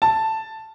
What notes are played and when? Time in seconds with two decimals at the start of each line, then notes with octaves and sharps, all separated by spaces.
0.02 A5